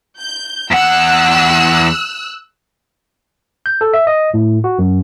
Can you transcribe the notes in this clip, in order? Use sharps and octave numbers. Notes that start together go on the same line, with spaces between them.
G6
E2 F#5 E6 F#6
G6
A4
E5
D#5
A2
F#4
F#2